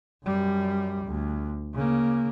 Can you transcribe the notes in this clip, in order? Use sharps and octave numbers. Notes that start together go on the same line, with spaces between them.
F#2 G3
D2
C#3 A#3